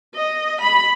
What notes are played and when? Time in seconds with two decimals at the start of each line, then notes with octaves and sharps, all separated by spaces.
0.15 D#5
0.61 B5